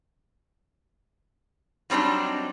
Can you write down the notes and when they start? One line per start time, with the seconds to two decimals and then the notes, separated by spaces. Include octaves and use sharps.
1.90 F#3 G3 C4 D4 D#4